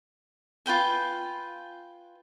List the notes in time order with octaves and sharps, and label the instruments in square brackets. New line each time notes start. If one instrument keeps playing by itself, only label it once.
[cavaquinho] F4 B4 G5 G#5